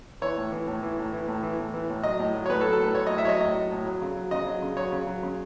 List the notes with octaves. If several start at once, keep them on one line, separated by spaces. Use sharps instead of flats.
E3 C#5
A2
E3
A2
E3
A2
E3
A2
E3
A2
E3
A2
F#3 D#5
A2
F#3
C#5
A2 B4
A4
F#3
A4
A2 B4
F#3 C#5
A2 D#5
E5
F#3 C#5 D#5
A2 D#5
F#3
A2
F#3
C#3
F#3
C#3 D#5
F#3
C#3
F#3 C#5
C#3
F#3
C#3